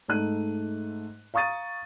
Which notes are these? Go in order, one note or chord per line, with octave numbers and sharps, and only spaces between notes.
G#2 A3 D#4 F#6 D#7
F5 A#5 C#6 D#6 A6 D#7